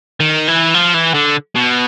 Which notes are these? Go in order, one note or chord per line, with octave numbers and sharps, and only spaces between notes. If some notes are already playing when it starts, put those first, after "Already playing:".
D#3
E3
F3
E3
D3
B2